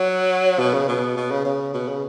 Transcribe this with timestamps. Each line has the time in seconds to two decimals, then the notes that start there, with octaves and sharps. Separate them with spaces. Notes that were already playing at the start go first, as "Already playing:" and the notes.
Already playing: F#3
0.59 B2
0.74 C#3
0.88 B2
1.17 B2
1.31 C#3
1.45 C#3
1.74 B2
1.88 C#3